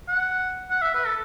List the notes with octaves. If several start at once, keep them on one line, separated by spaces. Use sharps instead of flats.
F#5
F#5
E5
B4
A4